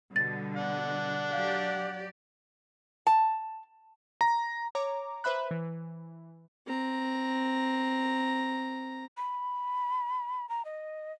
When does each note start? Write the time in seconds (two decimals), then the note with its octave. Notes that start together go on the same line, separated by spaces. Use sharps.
0.16 B2 D3 G3 A6
0.56 D4 F#5
1.33 F#3 G4 D5 F5
3.07 A5
4.21 A#5
4.75 C#5 A#5 D6
5.24 B4 C5 E5 B5 F#6
5.51 E3
6.67 C4 A#5
9.17 B5
10.49 A#5
10.65 D#5